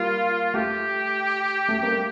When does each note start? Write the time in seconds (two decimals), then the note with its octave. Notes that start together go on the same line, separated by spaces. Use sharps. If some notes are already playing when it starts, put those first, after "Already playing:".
Already playing: G3 A#3 F4
0.54 A3 G4
1.69 A3
1.82 G3 A#3